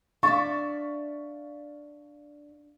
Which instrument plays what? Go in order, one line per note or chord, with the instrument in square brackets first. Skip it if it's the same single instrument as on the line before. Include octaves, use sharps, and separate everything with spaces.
[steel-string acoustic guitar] D4 D5 E5 [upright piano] F5 C#6 A6